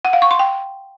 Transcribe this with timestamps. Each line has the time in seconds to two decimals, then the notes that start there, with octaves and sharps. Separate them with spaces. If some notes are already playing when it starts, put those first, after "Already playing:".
0.05 F#5
0.13 F5
0.22 C#6
0.31 C6
0.39 G5